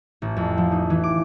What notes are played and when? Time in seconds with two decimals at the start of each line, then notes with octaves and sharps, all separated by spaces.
0.22 A1
0.36 F2
0.58 F3
0.72 D#4
0.90 E3
1.03 D6